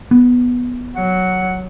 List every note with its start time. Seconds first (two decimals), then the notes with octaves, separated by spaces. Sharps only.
0.11 B3
0.95 F#3 F#5